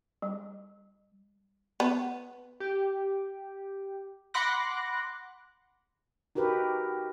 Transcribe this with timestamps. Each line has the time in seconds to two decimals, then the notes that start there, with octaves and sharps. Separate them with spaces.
0.22 G3
1.80 B3
2.60 G4
4.34 F#5 B5 C6 D6 F#6 A#6
6.35 D#4 F#4 G4 A#4 B4